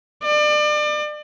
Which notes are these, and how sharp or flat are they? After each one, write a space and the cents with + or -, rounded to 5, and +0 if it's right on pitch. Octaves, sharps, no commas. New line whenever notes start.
D5 +35